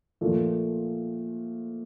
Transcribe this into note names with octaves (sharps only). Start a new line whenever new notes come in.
A#2 F3 A3